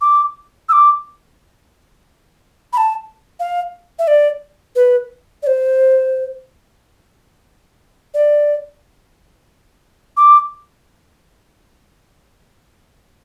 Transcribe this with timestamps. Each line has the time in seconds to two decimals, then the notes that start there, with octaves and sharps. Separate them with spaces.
0.01 D6
0.69 E6
0.72 D6
2.73 B5
2.77 A5
3.40 F5
3.99 E5
4.08 D5
4.76 B4
5.43 D5
5.47 C5
8.14 D5
10.17 D6